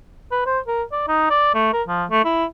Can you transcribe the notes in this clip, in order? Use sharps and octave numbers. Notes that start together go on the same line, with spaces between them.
B4
C5
A#4
D5
D#4
D5
A3
A#4
F3
A3
E4